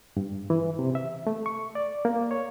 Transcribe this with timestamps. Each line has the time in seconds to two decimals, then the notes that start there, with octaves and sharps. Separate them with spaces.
0.17 G2
0.50 E3
0.79 C3
0.95 E5
1.27 A3
1.46 C#6
1.75 D5
2.05 A#3
2.31 C#5